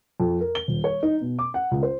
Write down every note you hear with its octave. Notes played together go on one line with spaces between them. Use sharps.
F2
A#4
G7
D#1
C#5
D#4
B2
D6
F#5
C#2
C5